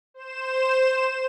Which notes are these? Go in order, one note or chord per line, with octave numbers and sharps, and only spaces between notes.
C5 E7